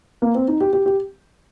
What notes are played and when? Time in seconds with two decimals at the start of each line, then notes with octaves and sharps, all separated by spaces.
0.22 A#3
0.35 C4
0.48 D#4
0.60 G4
0.73 G4
0.86 G4